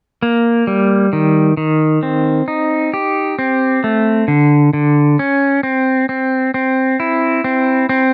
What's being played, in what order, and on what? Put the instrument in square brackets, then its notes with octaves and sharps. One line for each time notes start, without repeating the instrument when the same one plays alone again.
[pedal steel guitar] A#3
G3
D#3
D#3
C4
D#4
G4
C4
A3
D3
D3
C#4
C4
C4
C4
E4
C4
C4